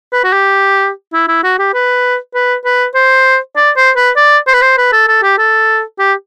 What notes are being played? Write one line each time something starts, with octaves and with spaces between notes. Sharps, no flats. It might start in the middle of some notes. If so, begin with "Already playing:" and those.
B4
F#4
G4
E4
E4
F#4
G4
B4
B4
B4
C5
D5
C5
B4
D5
C5
B4
C5
B4
A4
A4
G4
A4
G4